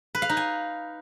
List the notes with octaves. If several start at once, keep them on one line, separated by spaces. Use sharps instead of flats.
B4
F5
D#4
G#5